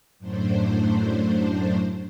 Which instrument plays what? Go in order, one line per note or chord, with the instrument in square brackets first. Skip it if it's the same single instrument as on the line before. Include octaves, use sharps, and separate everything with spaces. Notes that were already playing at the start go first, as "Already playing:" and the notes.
[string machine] F#2 A2 F#3 A3 D4 C5